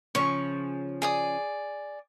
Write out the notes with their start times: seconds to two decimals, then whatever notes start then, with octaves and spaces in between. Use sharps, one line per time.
0.15 C#3 F3 C#4 C#6
1.02 G#4 D5 D#6